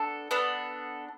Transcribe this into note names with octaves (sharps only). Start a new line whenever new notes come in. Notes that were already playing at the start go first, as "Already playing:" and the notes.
Already playing: B3 D4 A4
B3 D4 A4